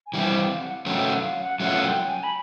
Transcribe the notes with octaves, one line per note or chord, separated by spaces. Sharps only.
G#5
E3 G3 C4 G5
F5
F#5
F#3 A3 C#4 G5
F#5
F5
F#5
F#3 A3 C#4 F4 F#5
G5
G#5
B5